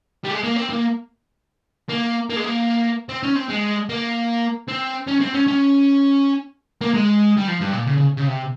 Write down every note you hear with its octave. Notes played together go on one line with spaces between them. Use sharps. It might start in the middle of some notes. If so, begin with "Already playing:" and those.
G3
G#3
A#3
C4
A#3
A#3
A#3
G#3
A#3
C4
C#4
C4
G#3
A#3
C4
C#4
C4
C#4
C#4
A#3
G#3
G3
F3
G2
A#2
C#3
C#3
C#3
C3